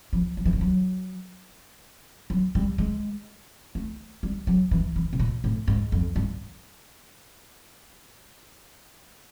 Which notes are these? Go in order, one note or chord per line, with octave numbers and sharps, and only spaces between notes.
F3
F3
E3
F3
F#3
F#3
G3
G#3
A3
G3
F#3
E3
E3
B2
A#2
A2
G#2
F2
G2